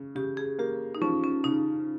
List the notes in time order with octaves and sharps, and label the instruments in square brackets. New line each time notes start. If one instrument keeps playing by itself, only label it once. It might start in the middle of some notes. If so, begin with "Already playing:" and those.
Already playing: [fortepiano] C#3
[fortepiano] C#3 [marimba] G4
[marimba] G#4
[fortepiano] A#3 [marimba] G4
[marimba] D#4
[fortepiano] F3 [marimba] C#4
[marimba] C#4
[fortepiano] C#3 [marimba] D#4